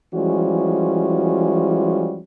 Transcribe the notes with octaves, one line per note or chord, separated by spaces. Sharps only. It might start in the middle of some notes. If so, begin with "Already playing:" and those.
E3 F3 G3 G#3 C#4 F#4